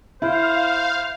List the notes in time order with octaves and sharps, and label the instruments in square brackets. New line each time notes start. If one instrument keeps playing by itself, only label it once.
[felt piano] E4 [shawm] C5 [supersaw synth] F5